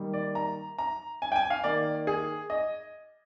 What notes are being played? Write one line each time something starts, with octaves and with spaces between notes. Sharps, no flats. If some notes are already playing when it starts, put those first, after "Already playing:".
Already playing: D#3 G3 A#3
D5
A#5
A#5
G#5
G5
G#5
F5
D#3 A#3 D5
G#4
D#5